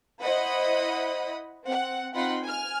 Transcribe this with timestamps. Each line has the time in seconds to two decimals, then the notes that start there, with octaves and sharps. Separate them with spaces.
0.21 E4 C5 D#5 F#5 B5 D#6
1.64 C4 F#5
2.14 C4 D#4 F4 F#5 B5 C6
2.44 G#5 F6